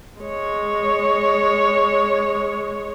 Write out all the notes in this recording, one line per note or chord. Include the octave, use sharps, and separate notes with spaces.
G#3 C#5